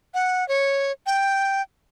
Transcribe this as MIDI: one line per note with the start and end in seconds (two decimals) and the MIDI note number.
0.14 0.47 78
0.49 0.92 73
1.06 1.62 79